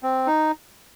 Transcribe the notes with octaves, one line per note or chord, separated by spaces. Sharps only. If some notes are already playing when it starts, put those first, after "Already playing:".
C4
D#4